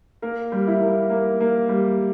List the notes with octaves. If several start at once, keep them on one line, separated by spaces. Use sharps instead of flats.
A#3 A#4
G3
E4
A#3
A#3
A#3
G3